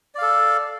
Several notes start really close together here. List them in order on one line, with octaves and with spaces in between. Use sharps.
D5 F5 A4